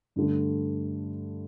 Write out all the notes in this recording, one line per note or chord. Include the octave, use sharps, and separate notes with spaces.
G2 D3 A3